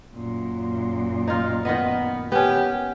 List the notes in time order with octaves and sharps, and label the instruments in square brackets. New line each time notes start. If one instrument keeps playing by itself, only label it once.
[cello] F#2 A#2
[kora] D#4 F4
[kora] D#3 D#5 [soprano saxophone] B3
[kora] B3 C#4 [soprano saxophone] G4